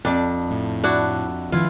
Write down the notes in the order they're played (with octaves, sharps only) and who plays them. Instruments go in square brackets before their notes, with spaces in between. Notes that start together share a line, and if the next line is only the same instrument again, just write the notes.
[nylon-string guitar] F2 [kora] D4 D5
[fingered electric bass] A2
[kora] D4 E4 F#4
[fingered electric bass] D#3 F3 [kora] E4 F4